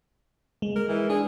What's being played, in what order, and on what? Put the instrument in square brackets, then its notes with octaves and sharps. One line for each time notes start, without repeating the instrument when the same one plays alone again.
[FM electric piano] G#3
[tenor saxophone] A#4
E3
[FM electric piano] D4 [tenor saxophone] G#4